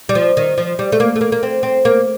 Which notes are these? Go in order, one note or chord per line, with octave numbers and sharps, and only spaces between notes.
G3
F3
D#3
F3
G3
A3
A#3
A3
A#3
A#3
C4
C4
A#3